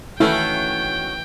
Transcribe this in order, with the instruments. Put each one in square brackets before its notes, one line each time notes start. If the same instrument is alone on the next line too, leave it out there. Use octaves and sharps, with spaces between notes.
[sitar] D#3 C#4 F#4 [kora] E3 A3 F5 [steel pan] E4 [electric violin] G5